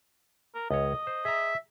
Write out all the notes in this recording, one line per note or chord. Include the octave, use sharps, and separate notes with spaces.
A#4
C#2 C#5 D#5
C5
G#4 E5 A#5